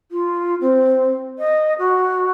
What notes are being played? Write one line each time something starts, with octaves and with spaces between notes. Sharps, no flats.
F4
C4
D#5
F#4